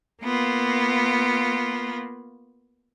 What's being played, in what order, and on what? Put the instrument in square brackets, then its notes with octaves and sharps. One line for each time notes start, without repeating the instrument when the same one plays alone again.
[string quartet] A#3 B3 F4